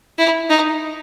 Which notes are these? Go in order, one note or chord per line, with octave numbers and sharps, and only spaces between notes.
E4
D#4